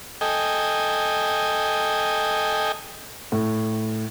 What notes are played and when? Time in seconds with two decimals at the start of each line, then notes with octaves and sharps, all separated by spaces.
0.21 A4 D#5 G5 G#5
3.32 A2